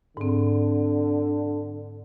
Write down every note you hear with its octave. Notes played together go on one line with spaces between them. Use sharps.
G#2 D3 C4